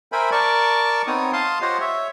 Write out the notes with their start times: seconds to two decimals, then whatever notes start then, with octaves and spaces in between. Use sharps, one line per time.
0.12 A#4 C5 E5 G5 G#5 B5
0.31 A#4 D5 A5 C#6
1.07 B3 C4 D#4 C#5 D#6
1.33 F5 A5 C6 D#6
1.62 F4 G4 C5 C#5 D#5 F#5
1.81 C#5 E5